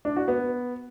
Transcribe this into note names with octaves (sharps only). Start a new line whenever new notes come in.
D4
F#4
B3